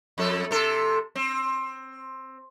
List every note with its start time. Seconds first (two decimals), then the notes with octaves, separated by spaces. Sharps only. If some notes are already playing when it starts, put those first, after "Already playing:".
0.18 F2 A4
0.51 C3 A4
1.15 C4